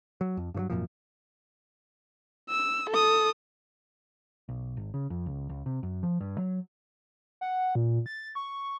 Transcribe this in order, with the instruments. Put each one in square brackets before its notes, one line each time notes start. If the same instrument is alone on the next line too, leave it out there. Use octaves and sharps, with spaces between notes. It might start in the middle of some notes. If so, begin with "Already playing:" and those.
[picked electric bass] F#3
F2
G2 D#3 F#3
G#1 F#2 A#2 F3
[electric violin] E6
A4 D#6
[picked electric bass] B1
G#1
C#3
F2
C#2
C#2
C3
F#2
F3
G2
F#3
[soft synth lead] F#5
A#2
A6
C#6